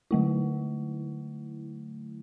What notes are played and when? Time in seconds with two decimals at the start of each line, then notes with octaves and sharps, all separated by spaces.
0.11 D3 F#3 A3 E4